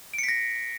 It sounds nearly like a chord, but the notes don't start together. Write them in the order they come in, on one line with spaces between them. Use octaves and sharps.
D7 C#7 B6 A#6